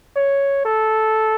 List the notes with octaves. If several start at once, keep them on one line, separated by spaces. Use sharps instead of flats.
C#5
A4